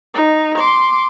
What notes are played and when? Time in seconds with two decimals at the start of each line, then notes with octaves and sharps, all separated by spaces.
0.14 D#4
0.58 C6 D6